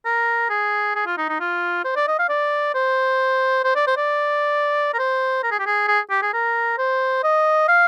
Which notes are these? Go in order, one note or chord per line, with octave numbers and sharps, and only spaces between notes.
A#4
G#4
G#4
F4
D#4
D#4
F4
C5
D5
D#5
F5
D5
C5
C5
D5
C5
D5
A#4
C5
A#4
G#4
G4
G#4
G#4
G4
G#4
A#4
C5
D#5
F5